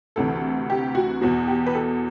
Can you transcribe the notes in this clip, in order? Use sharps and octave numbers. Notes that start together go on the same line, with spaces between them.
D2 C3 E3 A4
G4
F#4
E2 B2 F#4
G4
B4
A4